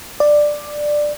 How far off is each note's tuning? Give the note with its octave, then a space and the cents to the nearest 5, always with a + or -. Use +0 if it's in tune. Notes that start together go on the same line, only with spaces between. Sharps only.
D5 +10